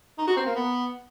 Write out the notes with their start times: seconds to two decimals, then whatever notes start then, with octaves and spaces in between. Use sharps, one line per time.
0.18 D#4
0.27 F#4
0.37 C4
0.46 A#3
0.55 B3